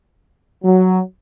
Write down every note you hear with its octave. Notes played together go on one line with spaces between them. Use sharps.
F#3